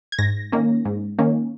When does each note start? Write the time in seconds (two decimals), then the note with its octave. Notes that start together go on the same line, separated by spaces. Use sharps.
0.12 G#6
0.19 G#2 A#6
0.52 D#3 A#3 C#4
0.85 G#2
1.19 D#3 A#3 C#4